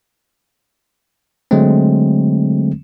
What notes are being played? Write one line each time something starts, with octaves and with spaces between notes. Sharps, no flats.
D3 F#3 G#3 A3 C4